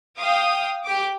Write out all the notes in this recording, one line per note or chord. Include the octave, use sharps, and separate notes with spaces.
F5 G5 D#6
G4 D6